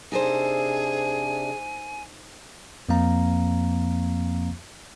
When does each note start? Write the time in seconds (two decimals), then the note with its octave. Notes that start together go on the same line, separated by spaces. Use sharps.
0.12 C3 D4 D#4 G#4 A4 C5 G#5
2.89 F2 F3 A#3 C4 F5 A#5